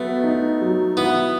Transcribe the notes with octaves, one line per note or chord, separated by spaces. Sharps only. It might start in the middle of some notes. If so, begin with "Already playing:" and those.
Already playing: F#3 A3 B3
D#4
F#3
B3 E4